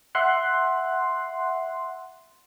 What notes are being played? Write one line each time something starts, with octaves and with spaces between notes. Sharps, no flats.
E5 F#5 C6 F#6